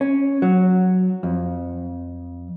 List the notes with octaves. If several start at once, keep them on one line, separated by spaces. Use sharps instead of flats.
C#4
F#3
F2